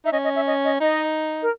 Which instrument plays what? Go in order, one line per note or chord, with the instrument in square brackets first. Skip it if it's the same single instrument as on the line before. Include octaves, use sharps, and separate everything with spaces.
[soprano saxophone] D#4 [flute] E5
[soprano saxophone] C#4 [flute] D#5
[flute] D#5
E5
D#5
D#5
[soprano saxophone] D#4 [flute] D#5
[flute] A#4